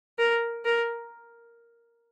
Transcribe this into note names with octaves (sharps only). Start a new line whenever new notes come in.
A#4
A#4